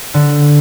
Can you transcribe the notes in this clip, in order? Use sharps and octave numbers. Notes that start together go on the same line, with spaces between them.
D3